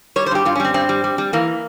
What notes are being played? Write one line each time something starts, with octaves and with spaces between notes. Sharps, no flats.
G3 C#5
C5
G2 G4
G2 F4
C#4
G3 C4
G2 C4
G3
G3
G3
E3 A#3